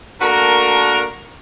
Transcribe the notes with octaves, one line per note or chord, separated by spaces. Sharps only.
A3 A#3 D4 F#4 A#4